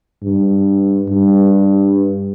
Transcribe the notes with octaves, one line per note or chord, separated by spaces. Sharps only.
G2
G2